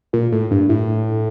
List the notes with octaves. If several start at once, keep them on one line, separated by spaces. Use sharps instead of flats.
A#2
A2
G2
A2